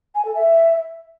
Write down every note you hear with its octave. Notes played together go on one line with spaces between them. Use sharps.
G#5
A4
E5